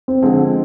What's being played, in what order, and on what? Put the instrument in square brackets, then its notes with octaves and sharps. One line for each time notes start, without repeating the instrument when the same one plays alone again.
[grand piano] C4
[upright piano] D3 F3 G#3 C4